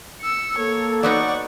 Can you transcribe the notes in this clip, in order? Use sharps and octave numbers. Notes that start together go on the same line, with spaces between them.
E6 C#7
A#3 A4 C#5
F#3 B3 D#4 D5 F#5 C#6